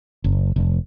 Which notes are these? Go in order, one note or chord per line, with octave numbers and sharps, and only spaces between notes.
F#1
F1